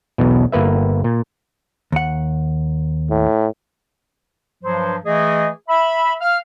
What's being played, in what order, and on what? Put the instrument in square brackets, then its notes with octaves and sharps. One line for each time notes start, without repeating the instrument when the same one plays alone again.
[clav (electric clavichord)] B1 E2 B2
G1 A#3 B4 E5
A#2
[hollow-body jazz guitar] D#2 F#5
[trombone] A2
[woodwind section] G2 F3 F#3 C5
E3 A3 G#4 D#5
E5 B5
F5 F6